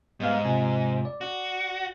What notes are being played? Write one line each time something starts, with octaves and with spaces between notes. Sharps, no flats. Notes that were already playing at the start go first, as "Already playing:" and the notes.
G#2 G3 B3 F5
C3 F4 G#5
D5
F#4